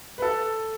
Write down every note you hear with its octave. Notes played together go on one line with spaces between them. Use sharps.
B4
A4